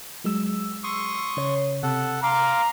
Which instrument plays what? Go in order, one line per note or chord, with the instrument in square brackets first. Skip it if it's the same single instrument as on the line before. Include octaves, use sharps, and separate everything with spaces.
[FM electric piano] F#3 G#3 E6
[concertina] C6 C#6 D#6
[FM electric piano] C#3 C#5
[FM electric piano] C3 [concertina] A4 F#5
[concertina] F5 C6 D6 [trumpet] A#5